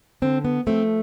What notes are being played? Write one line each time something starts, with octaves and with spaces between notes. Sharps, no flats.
D3 C4
B3
F3 A3 C4